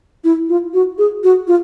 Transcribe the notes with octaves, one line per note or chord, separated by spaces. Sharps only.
E4
F4
F#4
G#4
F#4
F4